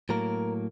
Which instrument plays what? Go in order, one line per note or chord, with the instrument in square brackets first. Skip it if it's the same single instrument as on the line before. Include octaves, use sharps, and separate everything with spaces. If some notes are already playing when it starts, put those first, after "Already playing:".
[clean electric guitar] A2 F#3 A#3 A#4